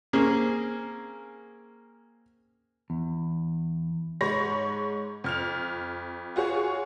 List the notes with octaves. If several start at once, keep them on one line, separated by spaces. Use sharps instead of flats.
A#3 C4 C#4 G#4
E2
G#2 G#3 C#5 B5 A#6
F2 F6 F7
F4 F#4 G#4 C#5